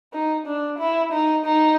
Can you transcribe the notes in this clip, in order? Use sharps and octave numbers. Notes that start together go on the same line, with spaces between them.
D#4
D4
E4
D#4
D#4